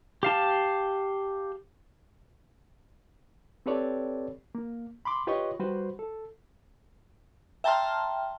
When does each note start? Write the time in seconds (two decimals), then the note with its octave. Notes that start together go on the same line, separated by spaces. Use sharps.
0.23 G4 F5 A5
3.66 C4 G4 A4 B4 C#5 D5
4.55 A#3
5.05 B5 C6 D6
5.27 F4 G4 B4 C#5 D#5 C#6
5.59 G3 F#4 B4 C5
5.99 A4
7.64 E5 G5 A5 A#5 C6 F6